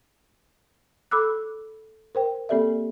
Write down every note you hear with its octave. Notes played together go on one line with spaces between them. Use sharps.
A4 B5 D6 E6 F#6
A#4 C5 G5
A#3 C4 G4 A4 D5 E5